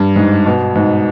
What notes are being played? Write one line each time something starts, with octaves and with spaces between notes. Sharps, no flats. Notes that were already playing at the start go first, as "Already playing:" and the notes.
Already playing: G2
G#2
B2
G#2